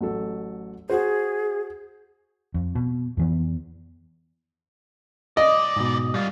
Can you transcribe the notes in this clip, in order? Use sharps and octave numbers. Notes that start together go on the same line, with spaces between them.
A1 F#3 A4
F#4 G#4 C5
F2
B2
F2 E3 B3
C#2 D5 D#5
G#2 B2
F#2 G3 F4